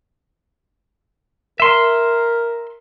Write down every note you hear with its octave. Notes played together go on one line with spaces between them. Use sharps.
A#4 E5 C6